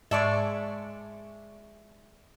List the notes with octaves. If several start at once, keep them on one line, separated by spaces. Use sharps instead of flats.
G#2 G#3 D5 E5 A5 C#6